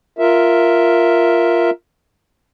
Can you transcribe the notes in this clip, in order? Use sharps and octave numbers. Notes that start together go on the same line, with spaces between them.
F4 A#4 E5